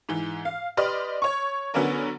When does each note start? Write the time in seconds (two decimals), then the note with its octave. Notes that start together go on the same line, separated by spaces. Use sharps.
0.09 G#2 E3
0.45 F5
0.77 G4 B4 D5 D#5 C6 F6
1.22 C#5 C#6
1.74 D3 F#3 B3 C#4 D4 A#4